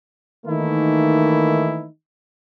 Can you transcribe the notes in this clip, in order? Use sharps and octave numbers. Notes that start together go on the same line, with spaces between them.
D#3 E3 A3 A#3 D#4 E4